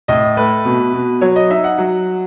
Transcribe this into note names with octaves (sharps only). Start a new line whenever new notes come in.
A2 D#5
A3 B4
B2
B2
F#3 C#5
D#5
D#4 E5
F#5
F#3